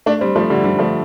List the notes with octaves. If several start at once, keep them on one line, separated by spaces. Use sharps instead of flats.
A3 D4
G3 C4
F3 A3
D3 G3
D3 G3
F3 A3